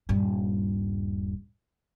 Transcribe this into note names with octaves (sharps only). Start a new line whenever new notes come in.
D#1 G2